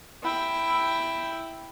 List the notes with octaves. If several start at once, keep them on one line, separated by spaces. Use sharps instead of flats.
E4 G5